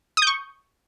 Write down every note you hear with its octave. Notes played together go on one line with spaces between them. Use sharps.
C#6 D#6 G6